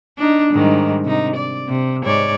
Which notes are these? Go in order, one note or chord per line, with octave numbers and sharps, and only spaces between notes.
D4 D#4
G#2 D#3 G3
C3 D#4
D5
C3
G#2 C#5 D5